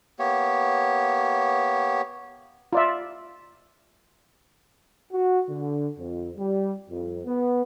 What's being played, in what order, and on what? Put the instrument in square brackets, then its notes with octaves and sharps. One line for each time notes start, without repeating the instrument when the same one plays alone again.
[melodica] A#3 B3 G4 C#5
[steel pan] F4 D5 E5
[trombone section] F#4
D3
F2
G3
F2
B3